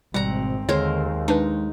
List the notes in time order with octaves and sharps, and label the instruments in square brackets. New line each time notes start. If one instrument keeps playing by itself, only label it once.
[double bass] G#1 C4 [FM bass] B2 [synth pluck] G3 [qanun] F#5 A#5
[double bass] D#2 [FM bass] D3 [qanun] G#3 A#4 C5 [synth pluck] C#5
[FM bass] G#3 [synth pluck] D4 B4 [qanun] D#4